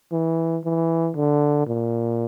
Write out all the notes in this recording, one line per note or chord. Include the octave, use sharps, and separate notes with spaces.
E3
E3
D3
A#2